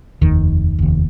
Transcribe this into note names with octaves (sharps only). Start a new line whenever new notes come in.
F1 D#2 D#3
F1 D#2